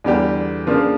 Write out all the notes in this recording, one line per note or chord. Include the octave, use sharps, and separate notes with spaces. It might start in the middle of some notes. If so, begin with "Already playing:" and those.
E2 D3 G3 D4 G4
C#3 F3 A#3 D4